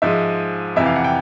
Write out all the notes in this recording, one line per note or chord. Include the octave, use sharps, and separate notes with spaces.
G#2 F3 G#3 E5
F2 C3 E3 E5
F5
F#5
G5